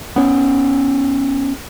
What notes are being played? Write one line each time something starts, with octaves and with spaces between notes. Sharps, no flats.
B3 C#4